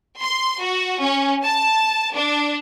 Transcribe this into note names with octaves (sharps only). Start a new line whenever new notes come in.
C6
F#4
C#4
A5
D4